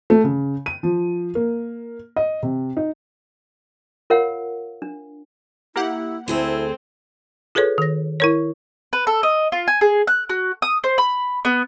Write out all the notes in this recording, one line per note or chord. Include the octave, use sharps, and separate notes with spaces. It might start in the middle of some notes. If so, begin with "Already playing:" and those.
A3
C#3
D#7
F3
A#3
D#5
C3
D#4
F4 A#4 C#5 F5 F#5
D4
A#3 E4 G4 F#5
D2 C4 E4 G#4 A4
F4 G#4 A4 B4 C#5
D#3 A#6
E4 A#4 C#5
B4
A4
D#5
F4
G#5
G#4
F#6
F#4
D#6
C5
B5
B3